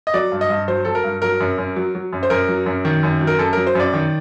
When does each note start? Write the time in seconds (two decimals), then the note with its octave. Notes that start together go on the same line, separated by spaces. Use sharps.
0.07 D#5
0.14 F#3 D5
0.32 G2
0.41 D#5
0.50 G2
0.68 F#3 C5
0.85 F#3 A4
0.95 A#4
1.04 G2
1.22 F#3 A#4
1.40 F#2
1.58 F#2
1.76 F#3
1.95 F#3
2.13 F#2
2.23 C5
2.30 F#2 A#4
2.48 F#3
2.66 F#2
2.85 D#3
3.03 F#2
3.21 F#3
3.27 A#4
3.39 F#2 A4
3.53 F#3 A#4
3.67 C5
3.75 F#2 D5
3.93 D#3